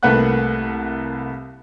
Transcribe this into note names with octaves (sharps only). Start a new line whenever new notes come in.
C2 A3 A#3 B4 F#5 F#6